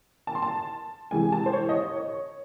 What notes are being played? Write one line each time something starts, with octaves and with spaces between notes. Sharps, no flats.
A5
C6
A5
C3 E3 G#3 G#5
A5
C5
C#5
D#5
C#5
C#5